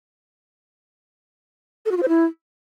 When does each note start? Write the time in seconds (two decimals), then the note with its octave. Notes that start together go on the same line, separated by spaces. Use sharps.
1.85 A4
1.91 F#4
1.97 F4
2.02 C5
2.08 E4